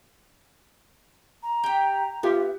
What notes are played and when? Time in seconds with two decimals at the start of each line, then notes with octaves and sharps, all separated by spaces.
1.43 A#5
1.64 G4 G5
2.23 B3 F4 G4 E5